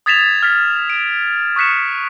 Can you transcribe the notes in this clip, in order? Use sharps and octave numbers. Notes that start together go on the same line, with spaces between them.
D#6 G#6 A6 B6 E7 F7
F6 A6 B6
D7
C#6 D#6 F#6 B6 C#7 E7